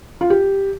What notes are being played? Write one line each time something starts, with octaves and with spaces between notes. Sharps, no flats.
F4
G4